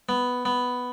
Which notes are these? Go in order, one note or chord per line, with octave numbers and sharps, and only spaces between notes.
B3
B3